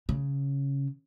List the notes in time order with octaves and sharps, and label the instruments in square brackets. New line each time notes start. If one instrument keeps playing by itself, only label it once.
[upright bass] C#3